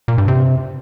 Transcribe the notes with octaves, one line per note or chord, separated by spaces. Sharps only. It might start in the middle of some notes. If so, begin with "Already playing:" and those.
A#2
G2
C3